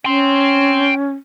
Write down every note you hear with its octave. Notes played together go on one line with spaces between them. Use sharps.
C#4 G5 C6